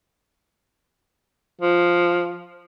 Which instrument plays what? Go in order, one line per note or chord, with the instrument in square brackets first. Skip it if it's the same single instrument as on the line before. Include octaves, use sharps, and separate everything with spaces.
[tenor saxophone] F3